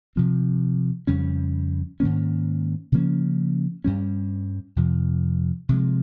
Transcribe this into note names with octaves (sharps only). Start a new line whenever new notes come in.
C3 F3 C4
F2 C#3 G3 C#4
G#2 D#3 A#3 C#4
C#3 F3 A#3 C#4
G2 G3 C#4
F2 C3 F3
C3 F3 G#3